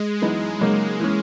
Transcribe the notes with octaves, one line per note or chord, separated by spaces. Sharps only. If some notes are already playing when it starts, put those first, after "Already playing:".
Already playing: G#3
F#2 E3 B3 D#4
C#3 F#3 A#3 D#4
E3 A#3 C#4